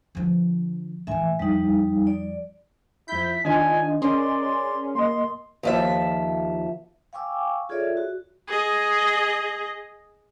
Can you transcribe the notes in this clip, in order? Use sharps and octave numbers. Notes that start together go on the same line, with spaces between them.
D3 F3
A2 E3 E5 G#5
F2 G3 D#4
D5
F2 E4 G6 B6
D#3 D4 F4 D#5 G#5
C#4 G#4 A#4 D5 C6
A#3 D#5 C6
D#2 F3 E5
F5 G5 G#5 C#6 D6 E6
F4 G#4 A4 C#5 D5 E5
F#4
G#4 D#5